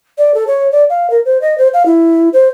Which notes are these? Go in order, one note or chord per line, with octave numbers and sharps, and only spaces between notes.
D5
A4
C#5
D5
F5
A#4
C5
D#5
C5
F5
E4
C5